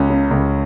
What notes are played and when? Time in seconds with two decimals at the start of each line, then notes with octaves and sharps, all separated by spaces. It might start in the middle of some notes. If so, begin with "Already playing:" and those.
Already playing: C#2 C#4
0.10 C#3
0.31 C#2